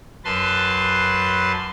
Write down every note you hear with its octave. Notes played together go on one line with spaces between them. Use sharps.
F#2 B4 A5 C6